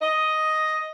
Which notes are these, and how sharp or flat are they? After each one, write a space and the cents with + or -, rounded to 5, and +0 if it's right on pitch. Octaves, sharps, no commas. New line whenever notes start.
D#5 +5